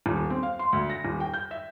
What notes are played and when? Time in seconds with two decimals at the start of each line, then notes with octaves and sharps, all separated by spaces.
0.06 D#1
0.30 C4
0.43 F5
0.59 C6
0.73 D2
0.90 A#6
1.05 D#1
1.20 G5
1.34 G6
1.51 E5